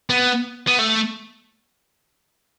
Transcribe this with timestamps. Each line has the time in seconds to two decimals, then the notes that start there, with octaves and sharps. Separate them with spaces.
0.10 B3
0.67 B3
0.79 A3